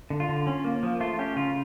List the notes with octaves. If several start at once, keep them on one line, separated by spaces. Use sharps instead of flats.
D3
F4
D3
C#4
A#3
F3
A3 F4
C#4 G4
C#3 F4